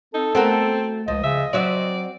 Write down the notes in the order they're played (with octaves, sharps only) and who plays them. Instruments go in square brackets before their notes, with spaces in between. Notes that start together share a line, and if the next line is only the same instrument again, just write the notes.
[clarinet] C4 [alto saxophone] D#4 [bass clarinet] A4
[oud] A3 F#4 A#4 [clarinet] B3 [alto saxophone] C4
[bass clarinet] C#2 [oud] F3 [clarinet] D#5
[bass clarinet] C#3 [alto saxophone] E5
[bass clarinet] F#3 [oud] C4 F#4 E5 [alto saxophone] D5